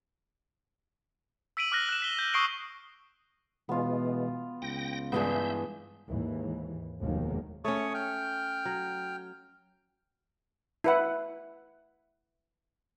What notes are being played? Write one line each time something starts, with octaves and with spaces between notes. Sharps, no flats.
E6 B6 D7 D#7 F#7
D6 F6 F#6 A#6
F#6 E7
B6 G7
G6
C#6 D#6 E6 C7 D7 G7
B2 E3 G#3 B3 F4
C#2 G5 A#6
G2 E3 G#3 B3 G#4 E5 G6
D#2 G#2 E3
F1 D#2 B2 D#3 G#3 A#3
A3 C#4 C#5 C#6 D#6
G5 F6
F#3
E4 B4 F#5